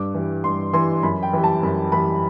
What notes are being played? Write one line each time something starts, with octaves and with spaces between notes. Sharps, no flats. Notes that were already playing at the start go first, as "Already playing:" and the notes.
Already playing: G2 D6
E3 G3
G2 C6
E3 G3 C6
F#2 B5
G5
E3 G3
A5
F#2 B5
E3 G3 B5